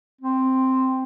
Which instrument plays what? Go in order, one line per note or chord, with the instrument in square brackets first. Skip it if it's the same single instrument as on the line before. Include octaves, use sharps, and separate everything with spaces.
[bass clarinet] C4